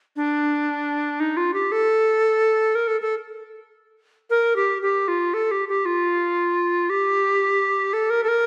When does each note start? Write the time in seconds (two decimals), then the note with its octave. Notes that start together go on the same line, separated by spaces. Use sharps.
0.16 D4
1.20 D#4
1.37 F4
1.54 G4
1.72 A4
2.75 A#4
2.88 A4
3.01 A4
4.30 A#4
4.56 G4
4.82 G4
5.08 F4
5.34 A4
5.51 G4
5.69 G4
5.85 F4
6.90 G4
7.93 A4
8.10 A#4
8.24 A4
8.28 A#4